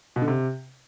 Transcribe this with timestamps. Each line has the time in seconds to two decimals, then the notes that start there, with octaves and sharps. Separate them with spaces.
0.16 B2
0.22 D3
0.28 C3